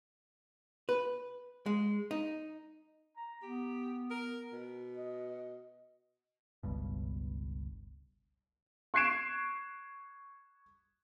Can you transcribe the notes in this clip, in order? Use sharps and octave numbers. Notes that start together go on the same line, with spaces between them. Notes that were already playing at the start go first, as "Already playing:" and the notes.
B4
G#3
D#4
A#5
B3 G4
A#4
B2
D#5
G1 C#2 G2 B2
C#6 F#6 G#6 C7 D7 E7